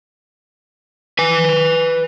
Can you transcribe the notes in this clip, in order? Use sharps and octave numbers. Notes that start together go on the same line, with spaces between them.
B4 G#5